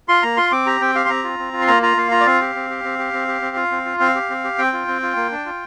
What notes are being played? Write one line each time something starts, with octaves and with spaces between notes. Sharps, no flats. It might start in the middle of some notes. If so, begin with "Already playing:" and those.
F4 C6
A#3 A#5
F4 C6
C4 D6
G4 A#5
C4 G5
G4 F5
C6
C4 A#5
F4
C4
F4
C6
A#3 A#5
F4 A#5
A#3 F5
F4 A#5
D5
C4 F5
G4
C4
G4
C4
G4
C4
G4
C4
F4
C4
F4
C4 F5
G4
C4
G4
C4 G5
F4
C4
F4
A#3
D4
F4